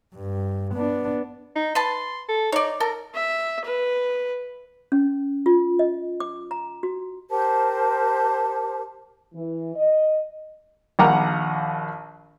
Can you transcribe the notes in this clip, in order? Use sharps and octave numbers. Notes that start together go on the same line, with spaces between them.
G2
B3 D4
D#4
B4 A5 C6
A4
D#4 C#5 D5
A4 A#4
E5
B4
C#4
F4
D#5
D6
A#5
F#4
G4 A#4 C5 A5
E3
D#5
A#1 D#2 F#5 A#5 D6 F6